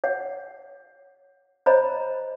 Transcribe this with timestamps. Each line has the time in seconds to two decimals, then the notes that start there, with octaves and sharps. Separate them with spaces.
0.04 C#5 F#5
1.66 C5 C#5 D#5 A#5 B5